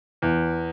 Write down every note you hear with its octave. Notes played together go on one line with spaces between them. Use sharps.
E2